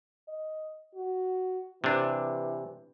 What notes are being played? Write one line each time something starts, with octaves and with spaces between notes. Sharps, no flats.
D#5
F#4
C3 E3 D4